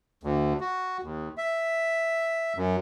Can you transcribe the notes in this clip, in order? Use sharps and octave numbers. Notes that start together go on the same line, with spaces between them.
D2
F#4
D#2
E5
F#2